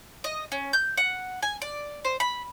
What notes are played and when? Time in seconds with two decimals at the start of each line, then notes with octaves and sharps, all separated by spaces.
0.24 D#5
0.52 C#4
0.73 G6
0.97 F#5
1.43 G#5
1.62 D5
2.05 C5
2.20 B5